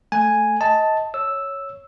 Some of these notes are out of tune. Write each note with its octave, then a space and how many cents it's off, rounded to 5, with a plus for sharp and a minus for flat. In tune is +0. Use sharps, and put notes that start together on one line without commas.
A3 +0 G#5 +0
D#5 +25 A5 +0
C#5 +0 E6 +0